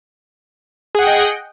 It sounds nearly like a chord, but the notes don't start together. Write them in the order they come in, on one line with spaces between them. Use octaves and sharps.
G#4 F#5 G5 D#5